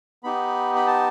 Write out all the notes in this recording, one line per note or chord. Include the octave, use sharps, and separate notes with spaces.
B3 D#4 G4 B5
B5
A5